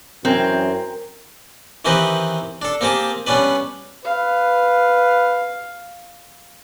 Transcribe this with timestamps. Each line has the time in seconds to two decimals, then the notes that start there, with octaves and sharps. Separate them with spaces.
0.25 F#2 E3 C4 A#4 G5 G#5
1.85 D#3 E3 C4 D#4 G4 B4
2.62 D4 A4
2.81 A#3 C4 G4 G#4 A5
3.27 G3 B3 C#4 D4 B4
4.05 B4 F5